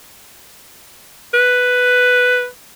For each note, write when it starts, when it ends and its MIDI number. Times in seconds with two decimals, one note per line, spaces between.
1.34 2.47 71